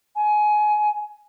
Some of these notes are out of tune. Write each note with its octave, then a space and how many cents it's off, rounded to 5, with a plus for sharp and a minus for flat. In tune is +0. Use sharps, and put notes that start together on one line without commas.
G#5 +20